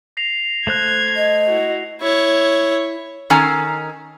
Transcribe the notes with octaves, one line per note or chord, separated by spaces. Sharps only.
A#6 C7 F7
A3 C5 F#6 G#6
D#5
E4 F#4
E4 C#5
D#3 C#4 A4 G#5 A#5